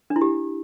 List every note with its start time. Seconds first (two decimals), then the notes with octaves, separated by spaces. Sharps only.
0.10 D4
0.16 E4
0.21 G4